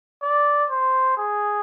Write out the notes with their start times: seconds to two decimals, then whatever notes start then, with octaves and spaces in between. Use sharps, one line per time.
0.22 D5
0.70 C5
1.17 G#4